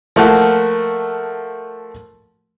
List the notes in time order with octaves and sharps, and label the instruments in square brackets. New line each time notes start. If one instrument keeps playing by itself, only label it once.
[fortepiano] F3 A3 A#3 F#4